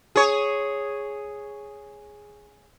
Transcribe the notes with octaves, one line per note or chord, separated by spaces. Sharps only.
G#4 C#5